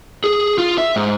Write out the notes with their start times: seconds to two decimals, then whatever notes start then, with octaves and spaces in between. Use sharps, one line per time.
0.24 G#4
0.58 F4
0.78 E5
0.96 G#2